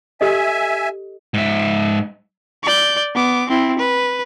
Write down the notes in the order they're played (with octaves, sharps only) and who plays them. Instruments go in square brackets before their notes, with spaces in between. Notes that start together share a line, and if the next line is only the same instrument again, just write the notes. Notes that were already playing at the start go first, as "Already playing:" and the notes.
[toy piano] G4 A4 D#5 [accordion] E5 G#5
[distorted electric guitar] G#2 E5
[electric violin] D5 G6
B3 D6
C4 E4
B4